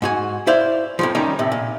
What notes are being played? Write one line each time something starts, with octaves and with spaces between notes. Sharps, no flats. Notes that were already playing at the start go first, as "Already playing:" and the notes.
G#2 F#4 G#5
E4 C5 D5 F5
F2 A2 F3
D#3 G3 C#4 D#4
A2 C3
A#2